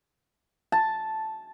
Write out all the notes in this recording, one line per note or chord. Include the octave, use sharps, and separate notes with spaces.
A5